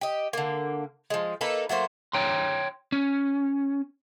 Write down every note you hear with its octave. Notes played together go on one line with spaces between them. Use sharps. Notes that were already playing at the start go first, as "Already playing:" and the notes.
G4 D#5
D3 A#3
F3 G#3
A#3 D#4 A4 B4
F#3 A3 A#3 C5
C#5 G5 A#5 C6
C#4